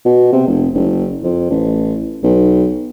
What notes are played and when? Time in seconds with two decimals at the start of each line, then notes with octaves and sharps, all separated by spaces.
0.06 B2
0.33 C3
0.47 F1
0.74 F#1
1.23 F2
1.50 A1
2.23 B1